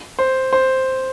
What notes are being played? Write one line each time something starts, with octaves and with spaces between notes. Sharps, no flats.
C5
C5